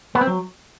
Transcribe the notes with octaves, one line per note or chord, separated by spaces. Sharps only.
B3
C4
F#3